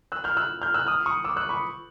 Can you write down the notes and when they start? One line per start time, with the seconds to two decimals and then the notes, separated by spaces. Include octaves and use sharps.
0.12 E6 F#6
0.24 F6 G6
0.37 E6 F#6
0.62 F6 G6
0.74 E6 F#6
0.87 D#6 F6
1.06 C#6 D#6
1.24 D6 E6
1.37 E6 F#6
1.49 B5 C#6